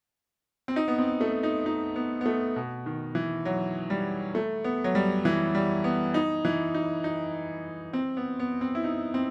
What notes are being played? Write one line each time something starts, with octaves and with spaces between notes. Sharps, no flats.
C4
D#4
B3
C4
A3
D#4
D#4
B3
B3
A3
B2
D#3
E3
F#3
G3
A3
B3
F#3
G3
E3
G3
B3
D#4
E3
D#4
D#4
C4
B3
B3
C4
E4
D#4
C4